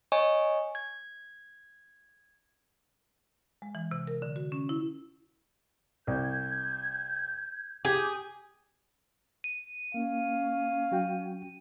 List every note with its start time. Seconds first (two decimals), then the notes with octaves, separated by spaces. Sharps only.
0.12 C#5 D#5 G#5 C#6
0.75 G#6
3.62 G#3
3.75 E3
3.91 C3
4.07 A#4
4.22 D3
4.36 F#4
4.52 C#4
4.69 E4
6.07 C2 G6 G#6
7.85 G4 G#4 D6 G6
9.44 D#7
9.94 A#3 C#4 F5
10.92 F#3 F#4 G5